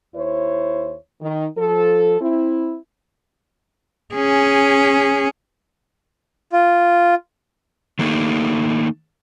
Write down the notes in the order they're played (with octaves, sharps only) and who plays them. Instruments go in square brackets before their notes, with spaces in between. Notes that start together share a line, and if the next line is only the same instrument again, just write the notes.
[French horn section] D#2 E4 C5 C#5
D#3
F3 A4
C4 E4
[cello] C#4 G#4
[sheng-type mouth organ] F4
[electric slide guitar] D#3 A3 A#3 D#4